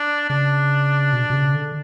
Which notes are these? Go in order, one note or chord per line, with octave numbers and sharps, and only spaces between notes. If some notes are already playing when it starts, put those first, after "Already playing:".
Already playing: D4
C#3 D4
B2
B2
C#3
D3